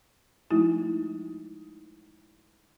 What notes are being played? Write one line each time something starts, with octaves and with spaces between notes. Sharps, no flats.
F3 G#3 A3 D#4 E4 F#4